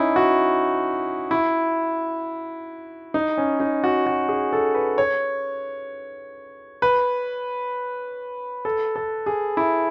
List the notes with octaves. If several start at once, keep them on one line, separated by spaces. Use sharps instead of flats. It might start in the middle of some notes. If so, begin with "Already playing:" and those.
Already playing: C#4 D#4 E4
F#4
E4
D#4
C#4
D#4
F#4
F#4
G#4
A4
B4
C#5
B4
A4
A4
G#4
E4